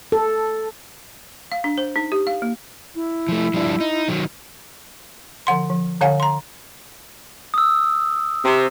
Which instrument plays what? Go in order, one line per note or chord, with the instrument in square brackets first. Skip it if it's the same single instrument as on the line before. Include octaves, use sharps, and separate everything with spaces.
[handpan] A4
[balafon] F5
D4
C5
D#4
G4
F5
A#3
[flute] E4
[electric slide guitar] F3 A3
F3 G3 D4
D#4
D#3 F#3
[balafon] D3 F3 F#5 C6
F3
D3 C#5 F5 F#5 G#5
A#5 C6
[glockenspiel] D#6 E6
[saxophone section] C3